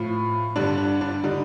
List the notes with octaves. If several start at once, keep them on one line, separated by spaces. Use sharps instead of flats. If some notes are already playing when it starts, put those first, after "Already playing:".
Already playing: A2 F3
G2 D3 G3 D4
D4
D4
D3 G3 D#4